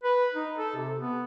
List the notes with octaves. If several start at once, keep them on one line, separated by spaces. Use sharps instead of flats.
B4
D#4
A4
C3
B3